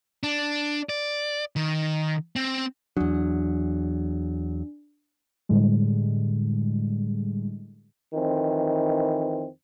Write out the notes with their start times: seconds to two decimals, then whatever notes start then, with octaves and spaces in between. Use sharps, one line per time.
0.23 D4
0.89 D5
1.56 D#3
2.36 C4
2.97 E2 F#3 D4
5.49 A2 D3 G3 G#3
8.14 F2 D#3 E3 C4